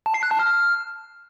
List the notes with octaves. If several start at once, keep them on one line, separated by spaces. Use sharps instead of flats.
A5
C7
F#6
A5
F6